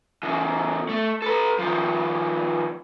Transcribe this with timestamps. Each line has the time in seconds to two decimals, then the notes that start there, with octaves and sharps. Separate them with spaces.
0.23 C#3 E3
0.89 A3
1.22 A4 B4
1.59 D#3 F3